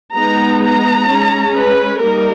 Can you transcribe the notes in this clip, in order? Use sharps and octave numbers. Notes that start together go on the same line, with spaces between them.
G#3 B3 D#4 A#5
A#5
G#3 C#4
B4
G3 A#3 D#4 A#4